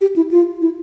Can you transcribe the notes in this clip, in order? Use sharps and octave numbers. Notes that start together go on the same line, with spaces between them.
G4
E4
F4
E4